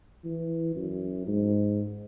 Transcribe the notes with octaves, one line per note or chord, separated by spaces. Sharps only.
E3
F#2
G#2